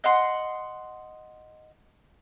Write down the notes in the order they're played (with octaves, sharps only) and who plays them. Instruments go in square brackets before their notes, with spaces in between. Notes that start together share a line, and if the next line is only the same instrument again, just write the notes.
[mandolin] D#5 F#5 C6